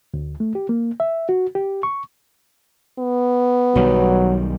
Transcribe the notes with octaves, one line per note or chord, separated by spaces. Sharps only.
D2
A3
G4
A#3
E5
F#4
G4
C#6
B3
B1 D#3 F#3 G3